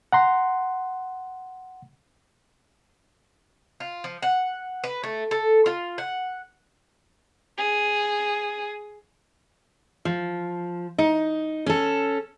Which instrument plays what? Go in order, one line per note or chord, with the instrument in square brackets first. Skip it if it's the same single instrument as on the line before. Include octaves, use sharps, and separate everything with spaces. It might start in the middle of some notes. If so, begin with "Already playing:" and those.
[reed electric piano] F#5 A#5 C6
[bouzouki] F4
F3
F#5
B4
A3
A4
F4
F#5
[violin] G#4
[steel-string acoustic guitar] F3
D#4
C#4 A4